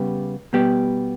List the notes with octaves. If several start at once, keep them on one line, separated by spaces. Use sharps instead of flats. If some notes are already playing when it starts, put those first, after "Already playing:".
Already playing: C#3 G3 B3 G4
B2 G3 B3 G4